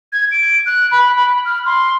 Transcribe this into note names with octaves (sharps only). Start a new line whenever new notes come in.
G#6
D7
F#6
B5
F6
C6